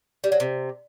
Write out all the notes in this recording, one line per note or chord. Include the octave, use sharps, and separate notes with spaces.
G3
F#3
C3